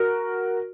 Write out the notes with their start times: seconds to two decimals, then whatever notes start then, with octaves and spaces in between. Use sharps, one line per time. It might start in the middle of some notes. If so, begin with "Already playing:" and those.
Already playing: F#4 A#4